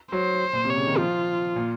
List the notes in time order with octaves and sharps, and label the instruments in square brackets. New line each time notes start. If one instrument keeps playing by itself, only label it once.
[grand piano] F#3 [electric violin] C5
[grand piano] A#2
[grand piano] C3 [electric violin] C#5
[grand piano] C#3
D#3
[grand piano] F3 [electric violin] F4
[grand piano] A#2